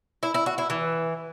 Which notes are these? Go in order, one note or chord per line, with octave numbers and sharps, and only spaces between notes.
E4
E4
F#4
E4
E3